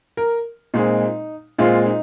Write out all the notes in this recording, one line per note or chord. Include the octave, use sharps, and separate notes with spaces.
A#4
A#2 G#3 C4 D#4
A#2 G#3 C4 F4
D#4